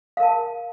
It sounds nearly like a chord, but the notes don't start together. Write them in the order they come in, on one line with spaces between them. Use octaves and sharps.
F5 A#4 A5